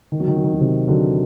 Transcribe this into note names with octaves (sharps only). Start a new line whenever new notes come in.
D#3
F#3
D#3
F#3
D#3
F#3
C3 D#3
D3 F#3